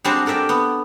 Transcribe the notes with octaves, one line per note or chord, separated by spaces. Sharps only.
G3 G#3 C4 D4 F#4
A4 A#4 D5 E5 G5
B3